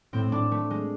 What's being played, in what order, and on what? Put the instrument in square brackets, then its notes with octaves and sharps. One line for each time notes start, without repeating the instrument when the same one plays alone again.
[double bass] A2 [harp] C4
[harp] D4
A3
G#3